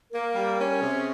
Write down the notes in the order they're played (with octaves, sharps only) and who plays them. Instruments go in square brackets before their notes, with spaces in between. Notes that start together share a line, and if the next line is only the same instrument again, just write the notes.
[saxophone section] A#3 [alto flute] A#4
[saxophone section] G3
C#4
[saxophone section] C3 [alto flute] G#4